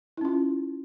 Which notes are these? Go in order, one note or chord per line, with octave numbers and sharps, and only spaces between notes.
C#4 E4 F4